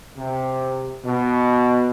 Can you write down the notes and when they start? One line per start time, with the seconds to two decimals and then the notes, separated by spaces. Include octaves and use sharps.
0.17 C3
1.05 B2